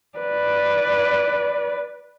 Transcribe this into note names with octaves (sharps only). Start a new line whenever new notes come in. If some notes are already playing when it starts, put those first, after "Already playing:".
B4 D5